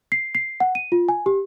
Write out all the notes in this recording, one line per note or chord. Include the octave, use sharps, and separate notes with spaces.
C7
C7
F#5
D#7
F4
G#5
G4